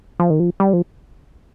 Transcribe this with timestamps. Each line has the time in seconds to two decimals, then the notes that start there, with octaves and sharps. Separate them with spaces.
0.20 F3
0.30 D#3
0.40 F3
0.60 G3
0.73 F3